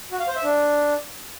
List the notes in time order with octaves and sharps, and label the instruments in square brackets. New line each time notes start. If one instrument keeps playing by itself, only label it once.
[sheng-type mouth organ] F#4
F5
C5
E5
D4